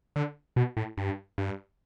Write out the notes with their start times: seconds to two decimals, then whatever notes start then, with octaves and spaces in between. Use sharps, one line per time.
0.16 D3
0.56 B2
0.77 A2
0.97 G2
1.38 G2